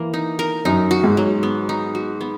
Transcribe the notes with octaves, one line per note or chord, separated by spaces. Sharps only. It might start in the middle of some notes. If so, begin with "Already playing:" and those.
Already playing: E3 A#3
D#4
A#4
F#2 D#4
F#4
G#2
F#3
B3
D#4
F#4
B3